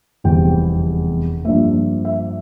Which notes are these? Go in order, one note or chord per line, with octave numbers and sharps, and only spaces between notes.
F1 E2 E3 G3 C4 G5
G2 F3 A#3 E5
E5